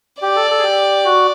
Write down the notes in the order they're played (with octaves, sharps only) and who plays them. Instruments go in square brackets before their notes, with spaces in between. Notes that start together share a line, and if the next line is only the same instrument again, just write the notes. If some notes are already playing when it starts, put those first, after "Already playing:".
[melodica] G4 [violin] D5
[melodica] A4
A4
G#4
G4
F#4